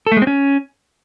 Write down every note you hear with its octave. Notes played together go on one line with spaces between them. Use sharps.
A4
A3
G#3
C4
C#4